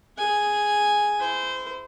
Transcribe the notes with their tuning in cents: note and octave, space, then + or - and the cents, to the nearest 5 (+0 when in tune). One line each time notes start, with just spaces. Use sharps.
G#4 +0 G#5 +0
E4 +0 C5 -20